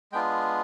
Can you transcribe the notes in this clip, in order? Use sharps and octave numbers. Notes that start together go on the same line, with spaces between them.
G#3 B3 D4 F4 G5